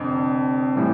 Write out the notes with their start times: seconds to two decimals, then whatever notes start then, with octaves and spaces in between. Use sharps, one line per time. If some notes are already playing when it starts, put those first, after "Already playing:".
Already playing: F1 F2 D3
0.75 A2 E3 G3